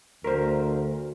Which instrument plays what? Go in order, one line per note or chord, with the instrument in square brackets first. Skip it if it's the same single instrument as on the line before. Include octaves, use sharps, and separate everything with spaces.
[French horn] D2 [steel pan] A#4 C5